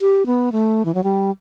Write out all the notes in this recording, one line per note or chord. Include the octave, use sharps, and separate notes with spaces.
G4
B3
A3
E3
F#3
G3